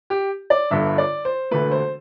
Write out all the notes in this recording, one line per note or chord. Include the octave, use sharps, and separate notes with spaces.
G4
D5
G1 G2 D3 E5
D5
C5
E1 D2 D3 A3 B4
C5